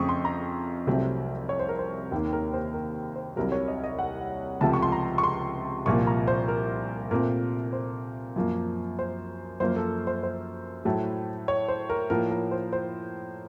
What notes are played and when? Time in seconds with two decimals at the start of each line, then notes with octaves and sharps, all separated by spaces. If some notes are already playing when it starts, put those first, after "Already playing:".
Already playing: F2 C#3 A3 C4 C#6 D#6
0.09 C6
0.25 A#5
0.87 C2 C3 F#3 A3 C4
1.49 C#5
1.59 C5
1.69 A#4
1.79 C5
2.12 D#2 D#3 A#3
2.33 A#4
2.53 C5
2.74 A#4
3.16 C5
3.36 C2 C3 F#3 A#4
3.52 C#5
3.68 D#5
3.84 D#5
3.99 F#5
4.61 C#2 C3 F3 A3 A5
4.73 C#6
4.82 C6
4.92 A#5
5.18 C#6
5.24 C6
5.86 C2 A#2 F3 A#3 C#6
6.07 A#5
6.28 C5
6.48 A#4
7.11 A#2 A3 C4 A#4
7.73 C5
8.36 F#2 F3 A#3
8.99 C5
9.60 F#2 F3 A#3 C5
9.76 A4
10.07 C5
10.23 C5
10.85 A2 F#3 A3
11.48 C#5
11.68 C5
11.89 A#4
12.10 A2 F3 A#3 A#4
12.31 A#4
12.51 C5
12.73 C5